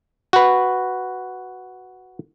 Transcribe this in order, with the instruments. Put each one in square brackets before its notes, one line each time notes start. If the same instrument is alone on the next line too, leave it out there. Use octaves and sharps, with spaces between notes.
[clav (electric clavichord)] F#4 B4